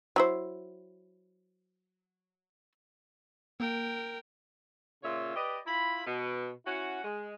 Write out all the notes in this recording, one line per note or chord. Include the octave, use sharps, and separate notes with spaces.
F#3 E4 C5
A#3 A#4 G5
A#2 C#3 F4 C#5 E5
G4 B4 D5 D#5
E4 F4 B5
B2
C#4 E4 F#4
G#3